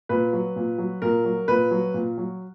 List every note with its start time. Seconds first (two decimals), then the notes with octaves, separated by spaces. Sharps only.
0.09 A#2 B4
0.33 F#3
0.56 A#2
0.78 F#3
1.02 A#2 A#4
1.25 F#3
1.48 A#2 B4
1.71 F#3
1.94 A#2
2.18 F#3